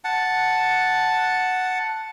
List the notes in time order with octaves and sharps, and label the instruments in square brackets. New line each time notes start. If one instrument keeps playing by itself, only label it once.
[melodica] F#5 A5